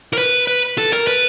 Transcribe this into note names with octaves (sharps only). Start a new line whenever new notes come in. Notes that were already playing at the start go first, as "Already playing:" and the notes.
A#4
B4
B4
A4
A#4
B4